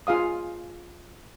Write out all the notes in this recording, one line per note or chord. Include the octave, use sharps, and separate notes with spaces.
F4 G#4 F5 D#6